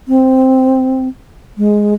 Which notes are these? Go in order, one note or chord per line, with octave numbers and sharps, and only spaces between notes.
C4
G#3